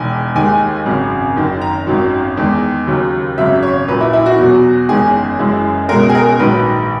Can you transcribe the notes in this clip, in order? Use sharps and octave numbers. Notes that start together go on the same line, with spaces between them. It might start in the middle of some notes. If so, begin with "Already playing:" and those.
Already playing: E1 E2 D#3 G#5
D#2 D#3 G#3 G#5
G#1 F#2 C#3 F#3
F#1 F#2 D#3
A#5
G#1 F#2 D#3 F#3
E2 D#3 G#3
D#2 C#3 F#3
G#1 F#2 C#3 F#3 E5
C#5
A#1 A#2 F#3 B4
E4
E4
F#4
E2 B2 F#3
F#1 E2 D#3 G#3 G#4
F#1 F#2 E3 G#3
C#2 B2 G#3 A#4
G#4
A#4
A#1 G#2 D#3 F#3 B4